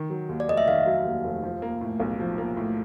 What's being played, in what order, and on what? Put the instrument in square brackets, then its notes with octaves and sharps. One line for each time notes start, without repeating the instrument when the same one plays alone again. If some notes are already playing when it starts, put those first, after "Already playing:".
Already playing: [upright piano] D#3
F#3
D#2
[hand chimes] D5
[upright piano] F1 [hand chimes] D#5
[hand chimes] E5
[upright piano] D#3 [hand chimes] F5
[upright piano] F#3
D#2
F1
F3
A#3
A2
B1
F3
A#3
A2